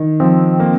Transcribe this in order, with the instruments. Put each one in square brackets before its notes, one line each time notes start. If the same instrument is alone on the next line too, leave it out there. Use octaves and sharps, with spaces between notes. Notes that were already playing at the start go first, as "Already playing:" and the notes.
Already playing: [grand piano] D#3
[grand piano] F3 [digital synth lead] C4
[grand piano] A#3